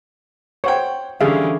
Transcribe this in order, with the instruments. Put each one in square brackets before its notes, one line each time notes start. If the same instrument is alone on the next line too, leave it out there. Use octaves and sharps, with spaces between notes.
[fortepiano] C5 F#5 G5 [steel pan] C#5
[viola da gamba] D3 E3 C#4 [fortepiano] G3 [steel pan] G#4 E5 F5